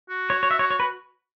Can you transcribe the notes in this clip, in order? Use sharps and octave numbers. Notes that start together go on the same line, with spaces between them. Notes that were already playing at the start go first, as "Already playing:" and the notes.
F#4
C#5
C#5
E5
C#5
C#5
B4